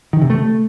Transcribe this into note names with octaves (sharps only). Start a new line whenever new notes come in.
D#3
C3
A3